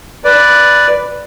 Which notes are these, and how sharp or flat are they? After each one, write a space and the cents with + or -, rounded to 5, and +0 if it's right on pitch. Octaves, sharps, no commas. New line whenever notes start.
B4 +0 D5 +0